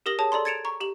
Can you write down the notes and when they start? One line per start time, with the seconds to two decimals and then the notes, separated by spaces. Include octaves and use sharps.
0.06 G4 A#4 D#6 A#6 F#7
0.19 G#4 C#5 A5 D#6
0.32 A4 D5 A#5 C6
0.45 G#6 A6 C#7 D7 E7 F7
0.65 A#5 C#6
0.80 G4 F#7